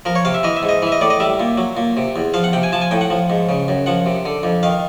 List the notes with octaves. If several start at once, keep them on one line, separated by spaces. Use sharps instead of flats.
F3 A#4
C#5
C3 F5
E5
E3 D#5
E5
G#2
D#5
E3 E5
D#5
A2 D5
D#5
G3 E5
A#2
F#3
A#2
C3
E2
F3 F5
F#5
C3 G5
G#5
F3 A5
G#5
A2 G5
F#5
F3
G#2
C#3
F#2
F3 F#5
C3
D3
F2
D#3 F5